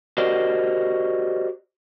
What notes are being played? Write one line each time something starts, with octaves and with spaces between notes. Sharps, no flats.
F#4 G4 A#4 C5 D5 D#5